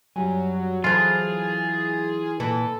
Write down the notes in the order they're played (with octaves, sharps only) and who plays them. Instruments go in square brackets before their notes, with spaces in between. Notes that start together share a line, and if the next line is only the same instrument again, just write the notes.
[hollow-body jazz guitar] F#2 G3 G#5 [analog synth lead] F#3
[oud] E3 C5 [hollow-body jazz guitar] F#3 A4 [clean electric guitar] F4 [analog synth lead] G#4
[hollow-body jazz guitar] A#2 B4 [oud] E3 [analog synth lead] A4